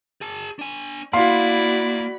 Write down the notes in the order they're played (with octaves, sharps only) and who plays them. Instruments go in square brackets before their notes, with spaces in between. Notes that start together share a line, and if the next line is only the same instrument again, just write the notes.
[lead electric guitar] G#4 A5
D4 G#5
[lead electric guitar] A#3 [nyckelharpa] E4 D5 [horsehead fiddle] F#4 B5 [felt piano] F5 C6 C7